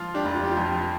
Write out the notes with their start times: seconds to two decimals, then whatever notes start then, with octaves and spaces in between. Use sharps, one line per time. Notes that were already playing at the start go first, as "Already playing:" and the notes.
Already playing: F3 F4
0.14 D4 G4
0.25 F1
0.35 F4
0.44 G4
0.51 F4
0.57 F2